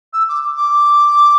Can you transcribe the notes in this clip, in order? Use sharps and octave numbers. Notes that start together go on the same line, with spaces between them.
E6
D6
D6